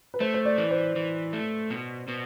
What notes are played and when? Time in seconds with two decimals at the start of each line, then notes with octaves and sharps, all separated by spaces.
0.14 B4
0.20 A3 C5
0.34 C5
0.45 D5
0.58 E3
0.71 C5
0.96 E3
1.33 A3
1.70 B2
2.08 B2